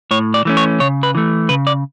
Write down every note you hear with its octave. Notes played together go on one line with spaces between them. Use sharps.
A2 C#5
D5
E3 A3 C#4
C#5
C#3 C#5
B4
E3 A3
C#3 B4
D5